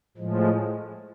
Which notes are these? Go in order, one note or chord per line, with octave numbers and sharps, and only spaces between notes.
A2 F3 G#3